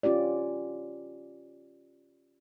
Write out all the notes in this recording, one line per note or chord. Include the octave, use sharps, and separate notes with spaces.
C#4 F4 G4 D5